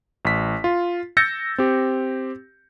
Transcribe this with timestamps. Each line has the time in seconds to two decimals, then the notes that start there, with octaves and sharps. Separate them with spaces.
0.25 A1 B6
0.64 F4
1.17 E6 G6 A6 A#6 C#7
1.58 C4 G4